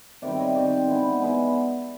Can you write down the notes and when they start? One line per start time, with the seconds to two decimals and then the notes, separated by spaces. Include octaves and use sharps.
0.22 C3 D#3 G3 C4 D5 E5
0.39 C#5 D#5
0.54 C3 D#3 G3 C4 C5 D5
0.87 E3 G#3 B3
1.20 E3 G#3 B3